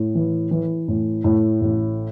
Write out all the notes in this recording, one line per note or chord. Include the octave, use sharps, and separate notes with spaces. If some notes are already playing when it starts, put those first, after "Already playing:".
Already playing: A2
E3
E3
A2
A2
A1